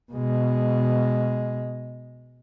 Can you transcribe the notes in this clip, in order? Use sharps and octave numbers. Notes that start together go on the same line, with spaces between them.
B2 G#3